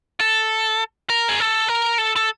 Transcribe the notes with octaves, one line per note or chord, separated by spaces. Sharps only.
A4
A#4
G#4
A4
A#4
A4
A4